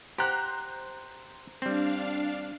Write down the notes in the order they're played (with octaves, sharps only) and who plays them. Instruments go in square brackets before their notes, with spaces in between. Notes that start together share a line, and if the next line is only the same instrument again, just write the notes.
[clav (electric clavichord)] G4 F#5 [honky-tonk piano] C5 A#5 F#6
[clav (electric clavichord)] G3 C4 [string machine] D4 F5